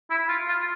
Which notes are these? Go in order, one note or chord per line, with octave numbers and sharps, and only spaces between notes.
E4
F4
F4